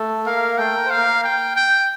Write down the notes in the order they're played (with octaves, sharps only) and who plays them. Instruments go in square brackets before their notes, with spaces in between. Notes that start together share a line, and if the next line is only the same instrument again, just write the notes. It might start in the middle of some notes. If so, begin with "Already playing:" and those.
Already playing: [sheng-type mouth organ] A3 A4
[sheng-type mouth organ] A#3 A#4 [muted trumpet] F5
[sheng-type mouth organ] A3 A4 [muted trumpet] G5
[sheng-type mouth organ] A#4
C5
[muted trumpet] F5
[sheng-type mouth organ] A#3 A#4
[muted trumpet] G5
G5